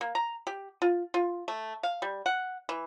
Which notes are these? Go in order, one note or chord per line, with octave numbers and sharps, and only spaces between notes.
A#3
A#5
G4
F4
F4
A3
F5
G3
F#5
E3